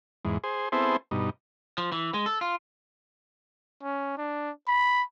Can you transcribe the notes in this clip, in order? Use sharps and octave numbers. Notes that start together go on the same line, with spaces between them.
E2 G#2
G#4 C5
B3 C4 E4 G#4 A4 C5
G2 B2 D#4
F3
E3
G#3
A4
F4
C#4
D4
B5